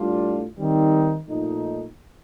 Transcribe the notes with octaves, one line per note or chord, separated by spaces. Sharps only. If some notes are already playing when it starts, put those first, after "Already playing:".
Already playing: A2 G3 D4 F4
D#3 G3 C4 D#4
A#2 F3 A3 D#4